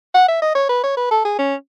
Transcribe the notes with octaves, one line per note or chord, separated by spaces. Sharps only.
F#5
E5
D#5
C#5
B4
C#5
B4
A4
G#4
C#4